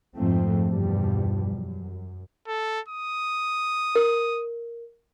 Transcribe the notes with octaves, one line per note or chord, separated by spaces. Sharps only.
F2 G#2 F3 A3 C4
E2 G2 B2 F3 G3
F#2
A4
D#6
A#4